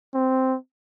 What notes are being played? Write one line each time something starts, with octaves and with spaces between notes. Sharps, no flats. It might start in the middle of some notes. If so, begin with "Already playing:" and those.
C4